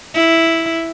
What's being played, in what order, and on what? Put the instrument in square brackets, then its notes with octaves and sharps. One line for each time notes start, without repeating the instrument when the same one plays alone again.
[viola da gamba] E4